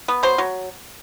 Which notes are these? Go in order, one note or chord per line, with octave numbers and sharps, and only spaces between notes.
B3
F#3 C5
F#3